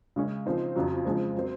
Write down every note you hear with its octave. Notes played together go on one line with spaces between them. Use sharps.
C#3 G#3 C#4
C#3 F3 C4 D#4
F2 C#3 F#3
C#3 F3 G#3 C4
F#3 C4